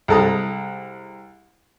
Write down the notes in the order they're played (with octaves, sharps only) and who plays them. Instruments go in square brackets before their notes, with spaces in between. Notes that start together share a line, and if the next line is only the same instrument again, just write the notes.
[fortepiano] C2 G#3 A4 A#5 D#6